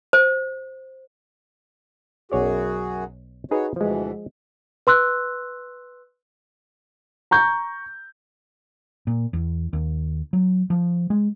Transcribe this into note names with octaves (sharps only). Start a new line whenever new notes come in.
C5
B1 F#2 F#4 G#4 C#5 D5
D#4 F#4 G#4 B4 C#5
D2 B2 E3 F3 G#3
B4 C6 E6 F#6
A#5 C#6 G6
A#2
E2
D#2
F#3
F3
G#3